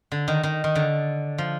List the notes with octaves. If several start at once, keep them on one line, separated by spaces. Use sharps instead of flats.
D3
D#3
D#3
D#3
D3
F3